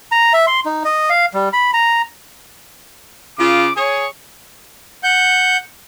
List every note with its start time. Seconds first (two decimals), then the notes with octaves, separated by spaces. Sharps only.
0.12 A#5
0.33 E5
0.47 C6
0.65 D#4
0.85 D#5
1.10 F5
1.34 G3
1.53 B5
1.73 A#5
3.39 C#3 F4 D6
3.76 G#4 C#5 D#6
5.04 F#5 G6